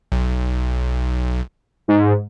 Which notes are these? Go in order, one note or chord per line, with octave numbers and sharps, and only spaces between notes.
B1
G#2